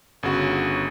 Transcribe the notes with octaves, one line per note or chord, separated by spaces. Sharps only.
G1 C#3 F#4